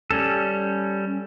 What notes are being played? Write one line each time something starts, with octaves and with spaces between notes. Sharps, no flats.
G3 C#4 A4